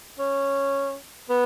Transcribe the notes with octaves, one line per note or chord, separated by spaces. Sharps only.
C#4
B3